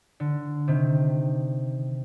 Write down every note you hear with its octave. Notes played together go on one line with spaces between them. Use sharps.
D3
C3 D#3